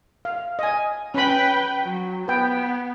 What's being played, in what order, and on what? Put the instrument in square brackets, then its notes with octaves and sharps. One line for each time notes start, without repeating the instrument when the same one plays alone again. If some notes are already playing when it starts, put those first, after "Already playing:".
[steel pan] F5
D#5 G#5
[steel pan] C#4 B5 [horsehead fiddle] B4 G5
[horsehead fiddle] F#3
[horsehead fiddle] B3 [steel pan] B4 G5